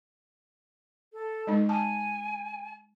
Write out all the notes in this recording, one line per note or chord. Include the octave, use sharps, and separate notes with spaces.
A4
G#3 D#4
G#5 A5